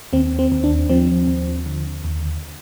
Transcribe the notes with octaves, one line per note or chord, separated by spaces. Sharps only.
D#2 C4
C4
D#2
D4
F3 C4
D#2
D3
D#2